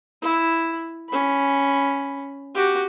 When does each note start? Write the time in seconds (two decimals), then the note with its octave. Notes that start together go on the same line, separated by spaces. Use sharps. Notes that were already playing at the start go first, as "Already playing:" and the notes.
0.21 E4
1.09 C#4 B5
2.55 F#4 G4